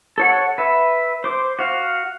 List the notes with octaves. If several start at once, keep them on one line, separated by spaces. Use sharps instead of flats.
A4 C#5 F#5
B4 E5
C5 D6
F#4 F5